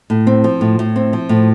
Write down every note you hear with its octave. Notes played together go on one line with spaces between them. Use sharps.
A2
C4
F3
A2
A2
C4
F3
A2